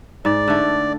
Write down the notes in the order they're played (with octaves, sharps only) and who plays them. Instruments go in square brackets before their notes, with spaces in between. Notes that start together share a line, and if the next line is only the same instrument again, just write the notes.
[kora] G#2 [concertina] D5
[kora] D3 A3